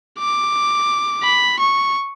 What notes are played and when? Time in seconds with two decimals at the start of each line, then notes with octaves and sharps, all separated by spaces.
0.19 D6
1.24 B5
1.59 C#6